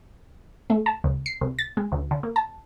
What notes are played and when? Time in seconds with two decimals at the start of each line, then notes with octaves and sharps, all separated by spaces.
0.70 A3
0.86 A5
1.04 C#2
1.26 C7
1.41 C2
1.59 A6
1.77 G#3
1.92 D2
2.11 D3
2.23 A#3
2.36 A5